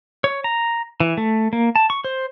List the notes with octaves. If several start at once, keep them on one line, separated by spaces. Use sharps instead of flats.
C#5
A#5
E3
A3
A#3
A5
C#6
C5